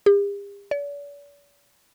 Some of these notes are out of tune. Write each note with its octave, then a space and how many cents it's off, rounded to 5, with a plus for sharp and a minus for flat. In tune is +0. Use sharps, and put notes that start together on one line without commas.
G4 +45
D5 -45